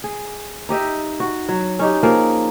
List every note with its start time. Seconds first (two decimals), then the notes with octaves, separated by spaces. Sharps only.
0.04 G#4
0.69 D#4 G4 D#5 E5
1.20 F#4
1.49 F#3
1.79 C#4 D#4 G4
2.03 F3 A#3 G#4